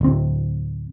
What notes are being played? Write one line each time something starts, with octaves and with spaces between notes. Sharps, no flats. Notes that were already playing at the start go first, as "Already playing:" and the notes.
D1 C4